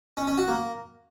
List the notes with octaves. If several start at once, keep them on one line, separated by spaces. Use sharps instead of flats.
C#4
C#4
F#4
A#3